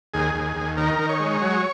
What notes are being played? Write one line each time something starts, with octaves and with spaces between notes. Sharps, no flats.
D#2 G#4
D#2
D#2
D#3 A#4
D#3
C#5
G#3
F#3